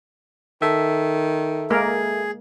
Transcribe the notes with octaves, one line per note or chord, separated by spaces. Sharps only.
D#3 A4 E5
G#3 A#3 G#4 A#4